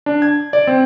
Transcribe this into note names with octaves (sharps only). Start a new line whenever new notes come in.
D4
G#6
D5
C4